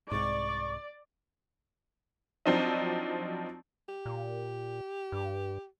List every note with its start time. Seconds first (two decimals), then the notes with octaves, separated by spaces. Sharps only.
0.11 C2 G#2 D5 C#6
2.46 F3 F#3 C4 D4 D#4
3.88 G4
4.06 A#2
5.12 G2